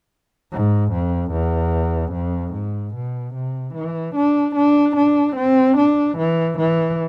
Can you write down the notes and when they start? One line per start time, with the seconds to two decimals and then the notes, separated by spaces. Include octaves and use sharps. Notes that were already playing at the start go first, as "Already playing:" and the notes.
0.52 G#2
0.92 F2
1.32 E2
2.13 F2
2.53 G#2
2.94 B2
3.34 C3
3.74 E3
4.15 D4
4.55 D4
4.96 D4
5.36 C4
5.77 D4
6.18 E3
6.58 E3